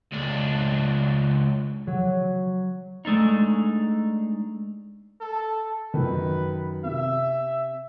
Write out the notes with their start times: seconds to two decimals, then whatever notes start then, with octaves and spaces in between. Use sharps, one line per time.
0.13 C#2 D4
1.87 F#3
3.05 G#3 A3 D4 D#4
5.21 A4
5.94 F#2 D#3 B4
6.84 C3 E5